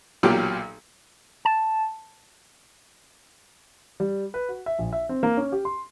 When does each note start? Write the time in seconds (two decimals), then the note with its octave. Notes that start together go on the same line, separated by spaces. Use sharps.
0.23 B1 A#2 F#3 F4 G4 D6
1.45 A5
4.00 G3
4.34 B4
4.49 F#4
4.66 E5
4.79 A#1
4.93 E5
5.09 C4
5.23 A#3
5.37 C#4
5.52 G4
5.65 C6